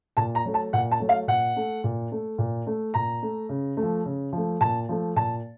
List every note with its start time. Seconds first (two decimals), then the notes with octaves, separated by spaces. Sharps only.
0.17 A#2 A5
0.35 A#5
0.45 F#3 A3
0.54 A5
0.73 A#2 F#5
0.91 A5
1.00 F#3 A3
1.09 F5
1.27 A#2 F#5
1.56 A3
1.84 A#2
2.12 A3
2.38 A#2
2.67 A3
2.94 A#2 A#5
3.22 A3
3.49 C#3
3.77 A3
3.83 F3
4.05 C#3
4.33 F3 A3
4.61 A#2 A5
4.89 F3 A3
5.16 A#2 A5